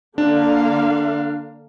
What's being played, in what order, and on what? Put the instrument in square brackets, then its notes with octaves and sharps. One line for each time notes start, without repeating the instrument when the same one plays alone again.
[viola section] D3 A#3 F5 [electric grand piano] D4